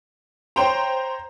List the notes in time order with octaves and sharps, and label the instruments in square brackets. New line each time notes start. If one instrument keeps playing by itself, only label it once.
[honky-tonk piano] C5 G5 A#5 [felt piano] C#5 C6